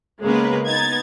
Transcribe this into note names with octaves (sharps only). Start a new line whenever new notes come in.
C#3 G#3 A#3 B3 A#4 B4
B3 D#4 G#6 A6